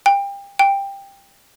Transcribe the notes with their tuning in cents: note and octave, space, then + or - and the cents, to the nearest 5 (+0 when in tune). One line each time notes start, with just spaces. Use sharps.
G5 +30
G5 +15